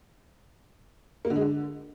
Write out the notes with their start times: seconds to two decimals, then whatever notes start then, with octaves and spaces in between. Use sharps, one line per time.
1.25 A#3
1.30 D3
1.36 G#3
1.41 D3